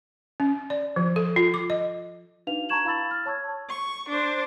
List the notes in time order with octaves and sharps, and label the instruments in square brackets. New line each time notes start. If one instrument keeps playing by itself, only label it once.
[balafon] C#4
D5
F3
A4
F4
D6
D#5
[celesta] D4 D#4 F#4 B4 F5 F7
A5 A#5 C#6 G#6 E7 F#7
E4 F5 B5 E6 A6 F#7
F6 A6
C#5 A5 C#6 E6 G#6
[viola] C#6
D4 C5